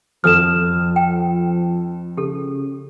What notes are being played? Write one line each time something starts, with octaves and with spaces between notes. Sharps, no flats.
F2 F3 A4 C5 D#6 F6 E7
G5
C#3 G4 A4